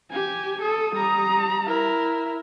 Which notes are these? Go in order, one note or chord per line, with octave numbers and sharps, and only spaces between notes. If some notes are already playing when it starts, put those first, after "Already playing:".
G4 G#5
A4 D#6
G3 A#5
E4 A#4